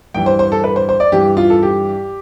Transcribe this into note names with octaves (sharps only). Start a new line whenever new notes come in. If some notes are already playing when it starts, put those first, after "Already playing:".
G2 E3 G5
C5
C5
A4
B4
C5
C5
D5
G2 E3 G4
F4
A4
G4